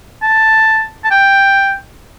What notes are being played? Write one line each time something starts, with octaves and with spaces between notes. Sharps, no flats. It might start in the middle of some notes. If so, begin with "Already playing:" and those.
A5
A5
G5